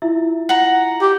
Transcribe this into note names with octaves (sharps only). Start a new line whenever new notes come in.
E4 F4 E5
F#5 A#5
G4